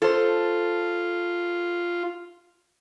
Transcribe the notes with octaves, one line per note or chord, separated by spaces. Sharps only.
F4 A4 C5